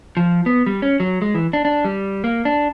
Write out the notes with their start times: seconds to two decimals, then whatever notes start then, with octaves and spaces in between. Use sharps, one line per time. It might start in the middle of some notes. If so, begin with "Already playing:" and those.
0.17 F3
0.46 B3
0.66 G3
0.82 C#4
1.00 F#3
1.22 G#3
1.34 E3
1.53 D4
1.65 D4
1.85 G3
2.24 A#3
2.45 D4